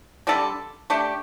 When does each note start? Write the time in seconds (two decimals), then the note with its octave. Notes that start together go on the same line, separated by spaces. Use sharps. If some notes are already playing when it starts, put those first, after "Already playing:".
0.27 D3 G3 D4 A4
0.90 A3 D4 G4